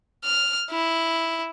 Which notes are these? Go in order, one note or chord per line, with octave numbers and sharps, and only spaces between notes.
F6
E4